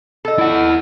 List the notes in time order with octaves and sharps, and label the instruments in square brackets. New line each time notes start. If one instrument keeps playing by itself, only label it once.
[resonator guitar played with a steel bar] A4 D#5
[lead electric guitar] E4 F#5